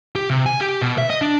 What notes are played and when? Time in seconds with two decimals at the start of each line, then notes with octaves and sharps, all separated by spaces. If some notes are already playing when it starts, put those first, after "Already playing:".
0.15 G4
0.30 C3
0.46 G#5
0.61 G4
0.82 B2
0.98 E5
1.10 D#5
1.22 D4